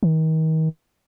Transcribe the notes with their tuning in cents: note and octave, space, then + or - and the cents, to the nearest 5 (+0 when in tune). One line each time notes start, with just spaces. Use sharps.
D#3 +35